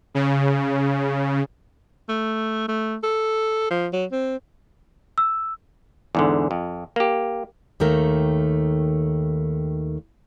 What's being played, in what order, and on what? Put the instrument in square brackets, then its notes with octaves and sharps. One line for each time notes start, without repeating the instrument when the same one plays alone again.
[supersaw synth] C#3
[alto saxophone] A3
A3
A4
F3
F#3
C4
[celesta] E6
[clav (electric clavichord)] E2 G#2 D3
F2
A#3 G4
[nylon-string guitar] D#2 D#3 A3 A#4